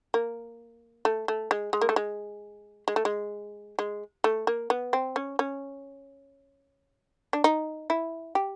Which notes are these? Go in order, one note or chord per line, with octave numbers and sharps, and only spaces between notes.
A#3
A3
A3
G#3
G#3
A#3
A3
G#3
G#3
A3
G#3
G#3
A3
A#3
B3
C4
C#4
C#4
D4
D#4
E4
G4